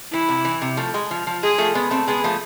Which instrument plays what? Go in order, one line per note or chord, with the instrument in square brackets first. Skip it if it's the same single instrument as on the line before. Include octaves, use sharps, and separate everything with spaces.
[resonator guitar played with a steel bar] E3 [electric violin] E4
[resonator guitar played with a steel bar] C3
E3
C3
F3 A3
G#3
F3
F3
[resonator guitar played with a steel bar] G#3 [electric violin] G#4
[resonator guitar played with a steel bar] F3 A3
G#3 B3
A3 C4
[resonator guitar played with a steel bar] G#3 B3 [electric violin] G#4
[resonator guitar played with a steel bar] F3 A3